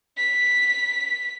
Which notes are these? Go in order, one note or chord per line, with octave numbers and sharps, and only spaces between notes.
B6